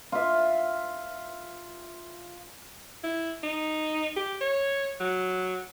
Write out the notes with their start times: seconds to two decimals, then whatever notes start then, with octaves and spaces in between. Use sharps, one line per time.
0.12 F4 E5
3.03 E4
3.43 D#4
4.17 G4
4.41 C#5
5.00 F#3